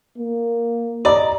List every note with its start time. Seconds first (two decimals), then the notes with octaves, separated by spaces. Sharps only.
0.18 A#3
1.05 D5 D#5 A#5